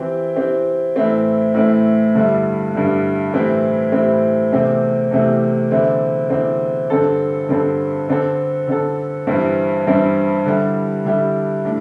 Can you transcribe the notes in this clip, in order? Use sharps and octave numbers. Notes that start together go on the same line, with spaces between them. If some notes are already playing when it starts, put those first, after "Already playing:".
Already playing: E3 C4 G4
E3 C4 G4
A2 E3 A3 C4 E4
A2 E3 A3 C4 E4
G2 D3 G3 E4
G2 D3 G3 E4
A2 E3 C4 E4 G4
A2 E3 C4 E4 G4
E2 C3 A3 C4 G4
E2 C3 A3 C4 G4
E2 D3 C4 E4
E2 D3 C4 E4
G2 D3 C4 A4
G2 D3 C4 A4
D3 C4 A4
D3 C4 A4
G2 E3 G3 C4 E4
G2 E3 G3 C4 E4
D3 G3 E4 G4
D3 G3 E4 G4
A2 D4